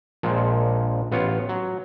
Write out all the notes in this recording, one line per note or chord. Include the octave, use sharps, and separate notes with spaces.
A#1 A#2 F3 G#3
A1 B3 F4 C#5
F#3